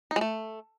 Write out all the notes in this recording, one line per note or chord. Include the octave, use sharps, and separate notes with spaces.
D#4
G#3
A3